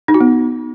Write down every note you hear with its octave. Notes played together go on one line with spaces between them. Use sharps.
D#4
F#4
B3